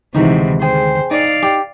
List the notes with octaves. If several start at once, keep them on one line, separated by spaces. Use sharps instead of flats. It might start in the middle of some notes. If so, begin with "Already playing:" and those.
D2 C3 D#3 E3 G#3 D#4 E4 F#4
G#4 C5 G5
D#4 D5 F5
G4